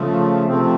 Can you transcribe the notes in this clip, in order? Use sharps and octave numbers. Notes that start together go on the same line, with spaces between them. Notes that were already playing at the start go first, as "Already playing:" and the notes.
Already playing: C#3 F3 A3
C3 F3 A3 C4